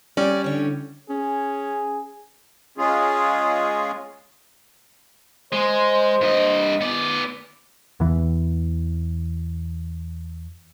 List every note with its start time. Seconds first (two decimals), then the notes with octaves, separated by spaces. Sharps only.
0.17 G3 C#4 D5
0.44 A2 D3 C#5
1.09 C#4 G#4
2.78 G#3 C#4 F4 G#4
5.52 G#3 C5
6.21 G2 D#5
6.81 B3 D5
8.00 E2 E3